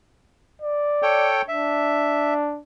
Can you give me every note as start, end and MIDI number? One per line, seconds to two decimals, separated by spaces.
0.62 1.31 74
1.03 1.42 69
1.03 1.42 73
1.03 1.42 79
1.48 2.60 62
1.48 2.34 76